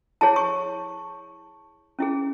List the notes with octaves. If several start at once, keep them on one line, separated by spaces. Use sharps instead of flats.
E4 G#4 C#5 A5
C#6
C#4 E4 G#4